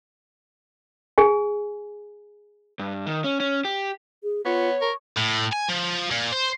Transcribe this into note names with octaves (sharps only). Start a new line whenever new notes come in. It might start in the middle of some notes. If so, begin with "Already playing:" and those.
G#4 G#5
G2
D#3
C#4
C#4
G4
G#4
B3 F4 C#5
A#4 C#6
A2
G#5
F3
A#2
C5